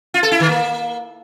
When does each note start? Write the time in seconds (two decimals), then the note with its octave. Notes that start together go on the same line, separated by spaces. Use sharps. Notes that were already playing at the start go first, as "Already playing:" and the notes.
0.14 F4
0.23 A4
0.32 E4
0.40 D#3
0.49 A#3